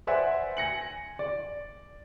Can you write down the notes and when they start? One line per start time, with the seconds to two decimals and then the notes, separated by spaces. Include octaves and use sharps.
0.07 B4 C5 D5 E5 F#5 G#5
0.57 G#5 A#6 C#7 F#7
1.19 D5